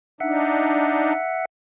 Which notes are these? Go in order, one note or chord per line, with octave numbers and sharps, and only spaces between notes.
D4 D#4 E5 F#5